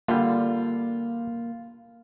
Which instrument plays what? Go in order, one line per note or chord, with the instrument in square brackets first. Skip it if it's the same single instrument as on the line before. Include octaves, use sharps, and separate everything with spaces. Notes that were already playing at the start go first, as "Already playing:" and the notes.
[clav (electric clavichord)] D3 G3 [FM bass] A#3 [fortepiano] F4